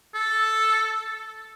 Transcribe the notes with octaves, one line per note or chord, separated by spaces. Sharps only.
A4